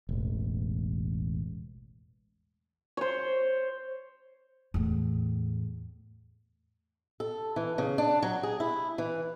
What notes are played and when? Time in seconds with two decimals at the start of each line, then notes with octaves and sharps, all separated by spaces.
0.09 E1 A1
2.97 C5 C#5
4.74 E2 A2
7.20 A4
7.56 E3
7.78 C#3
7.98 D4
8.22 F#3
8.43 G#4
8.60 E4
8.98 E3